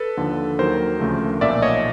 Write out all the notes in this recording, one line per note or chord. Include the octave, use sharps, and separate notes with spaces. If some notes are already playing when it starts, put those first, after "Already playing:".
Already playing: A4 B4
D#2 D3 F3
D#2 D#3 F#3 A#4 C5
D2 C#3 F3 A3
B1 A#2 F3 D5 E5
C#5 D#5